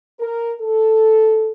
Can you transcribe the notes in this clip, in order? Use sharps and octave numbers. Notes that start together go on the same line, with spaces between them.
A#4
A4